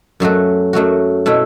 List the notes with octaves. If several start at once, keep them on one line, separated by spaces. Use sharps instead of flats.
F#2 F#3 A3 F#4
F#2 F#3 A3 F#4
B2 A3 E4